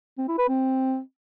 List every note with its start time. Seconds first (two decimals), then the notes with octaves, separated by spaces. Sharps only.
0.18 C4
0.28 E4
0.38 B4
0.48 C4